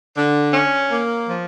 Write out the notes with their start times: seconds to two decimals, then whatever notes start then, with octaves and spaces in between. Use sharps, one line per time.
0.17 D3
0.54 C#4
0.90 A#3
1.27 F3